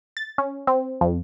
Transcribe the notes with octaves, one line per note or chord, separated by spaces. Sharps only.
A6
C#4
C4
F2